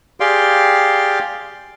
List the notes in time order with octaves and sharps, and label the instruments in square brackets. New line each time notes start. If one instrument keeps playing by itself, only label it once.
[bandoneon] G4 G#4 D5 F5 G5 C6